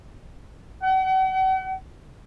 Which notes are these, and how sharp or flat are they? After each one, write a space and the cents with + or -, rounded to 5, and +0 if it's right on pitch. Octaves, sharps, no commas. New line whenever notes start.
F#5 +40